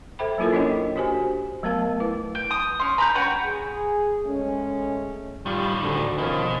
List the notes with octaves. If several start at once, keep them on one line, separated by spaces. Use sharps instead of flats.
A4 C5 E5 G5 B5
F#3 A#3 E4 F4 A4 A#4
C#4 D4 E4 C#5 D#5 G5
D4 F#4 G4 C5 G#5
F#3 A3 B3 A#4 F5 A5
E4 B4
G5
D#6
C#4 C6
A#5 B5 D6 G6
C#4 F#4 B4 G5
G#4
G#3 A3 C#4
A2 D#3 G3 F4 D5
D2 D4
B2 D#3 F3 C#4